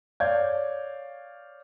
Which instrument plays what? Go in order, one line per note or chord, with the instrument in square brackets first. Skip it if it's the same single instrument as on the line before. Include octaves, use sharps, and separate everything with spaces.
[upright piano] C#5 D5 F5 G6 G#6